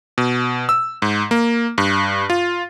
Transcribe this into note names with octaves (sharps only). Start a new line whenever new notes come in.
B2
E6
G#2
A#3
G2
F4